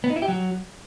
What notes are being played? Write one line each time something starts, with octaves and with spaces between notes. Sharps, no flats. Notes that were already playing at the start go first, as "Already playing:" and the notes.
B3
D#4
E4
G4
F#3